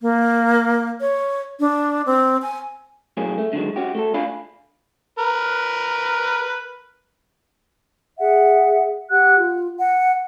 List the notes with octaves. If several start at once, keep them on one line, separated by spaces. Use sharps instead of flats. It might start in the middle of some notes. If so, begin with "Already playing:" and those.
A#3
C#5
D4
C4
G#5
B1 A2 F#3 A#3 C#4 G#4
A3
D3 D#3 F#3 G#3
C#4 F#4 G4
A3 F#4 A4
D4 F4 D5 F5 G#5 B5
A#4 B4
G#4 E5 F#5
G4 F#5 F#6
F4
F#5